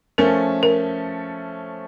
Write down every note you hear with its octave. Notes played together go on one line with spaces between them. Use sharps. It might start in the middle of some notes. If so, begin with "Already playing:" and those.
F3 A3 C#4 A#4
A#4